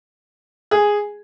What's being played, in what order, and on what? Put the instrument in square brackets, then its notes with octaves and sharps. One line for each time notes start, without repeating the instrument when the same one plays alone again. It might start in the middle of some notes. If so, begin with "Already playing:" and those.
[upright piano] G#4